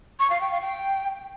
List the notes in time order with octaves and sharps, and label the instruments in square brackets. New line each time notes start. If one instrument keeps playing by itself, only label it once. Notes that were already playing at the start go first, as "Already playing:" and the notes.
[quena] C#6
F5
G5
F5
G5